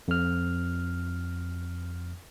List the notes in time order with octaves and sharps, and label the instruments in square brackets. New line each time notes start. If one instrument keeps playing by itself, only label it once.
[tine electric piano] F2 F6